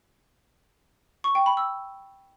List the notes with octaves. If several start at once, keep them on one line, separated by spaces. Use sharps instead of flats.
C#6
G5
B5
E6